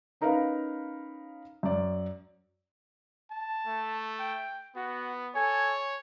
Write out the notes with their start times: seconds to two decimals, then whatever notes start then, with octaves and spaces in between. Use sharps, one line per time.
0.21 C#4 D#4 A#4 B4 F5 B5
1.63 F#2 D5
3.30 A5
3.67 A3
4.19 G5
4.76 B3 F#4
5.36 A4 C#5 G#5